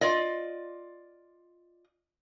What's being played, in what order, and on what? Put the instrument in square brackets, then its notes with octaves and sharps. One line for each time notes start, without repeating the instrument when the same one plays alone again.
[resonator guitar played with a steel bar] F4 D5 D#5